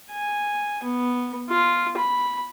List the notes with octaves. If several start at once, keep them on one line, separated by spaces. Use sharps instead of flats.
G#5
B3
F4
B5